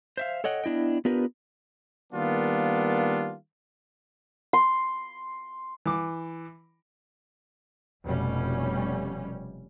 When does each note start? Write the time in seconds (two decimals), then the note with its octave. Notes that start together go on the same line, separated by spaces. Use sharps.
0.17 C5 E5 F5
0.44 A4 C#5 D#5 F#5 G5
0.64 B3 D4 E4 D#5 G5
1.05 B3 D4 F4 G4 A#4 B4
2.13 D#3 G3 A#3 B3 D4 F4
4.53 C6
5.86 E3 D6
8.04 F1 B2 G3 C#4